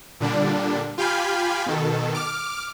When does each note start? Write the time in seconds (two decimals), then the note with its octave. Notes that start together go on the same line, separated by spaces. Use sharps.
0.20 A#2 D3 G3 D4
0.98 F4 G4 F5 G5 G#5 B5
1.66 B2 D#3 A4
2.15 D6 F6